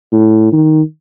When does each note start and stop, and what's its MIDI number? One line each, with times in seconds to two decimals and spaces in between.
0.12 0.48 45
0.52 0.82 51